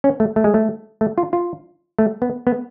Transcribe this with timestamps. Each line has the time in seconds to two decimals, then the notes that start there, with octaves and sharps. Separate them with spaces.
0.04 C#4
0.20 A3
0.36 A3
0.44 G#3
0.54 A3
1.01 A3
1.18 F4
1.33 F4
1.99 A3
2.22 B3
2.47 B3